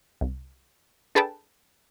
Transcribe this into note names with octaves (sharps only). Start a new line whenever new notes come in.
C2
D4 G#4 A4 B4 G5 A5